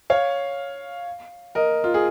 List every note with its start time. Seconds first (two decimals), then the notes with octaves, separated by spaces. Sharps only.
0.10 C#5 F5
1.55 A#4 D#5
1.84 F4
1.94 G#4